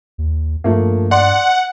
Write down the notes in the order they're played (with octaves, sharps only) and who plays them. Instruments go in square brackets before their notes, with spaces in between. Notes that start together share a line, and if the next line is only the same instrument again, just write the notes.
[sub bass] D#2
[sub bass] G2 [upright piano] F3 A3 A#3
[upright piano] D5 C6 [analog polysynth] F#5